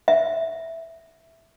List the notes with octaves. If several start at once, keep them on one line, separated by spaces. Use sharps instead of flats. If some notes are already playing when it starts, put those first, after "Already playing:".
E5